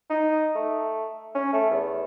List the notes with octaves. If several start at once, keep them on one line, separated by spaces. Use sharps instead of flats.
D#4
A3
C#4
A3
E2